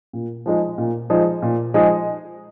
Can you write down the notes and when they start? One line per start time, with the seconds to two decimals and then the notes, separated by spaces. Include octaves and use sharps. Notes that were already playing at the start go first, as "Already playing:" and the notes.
0.13 A#2
0.46 F3 G#3 D#4 G#4
0.78 A#2
1.10 F3 G#3 D#4 G#4
1.42 A#2
1.74 F3 G#3 D#4 G#4